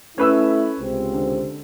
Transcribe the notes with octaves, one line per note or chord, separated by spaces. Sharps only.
A3 C#4 E4 B4 E6
C#2 C3 C4
D3